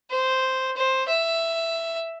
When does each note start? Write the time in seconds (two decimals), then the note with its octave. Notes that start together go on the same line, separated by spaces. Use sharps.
0.11 C5
0.76 C5
1.08 E5